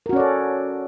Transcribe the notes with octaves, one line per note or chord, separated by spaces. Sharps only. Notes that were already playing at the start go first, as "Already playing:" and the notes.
C#4 F#4 A4 A#4 D5